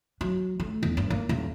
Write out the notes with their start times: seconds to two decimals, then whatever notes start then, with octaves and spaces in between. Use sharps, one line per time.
0.21 F#3
0.60 A3
0.83 E2
0.97 G2
1.10 A#3
1.29 D#1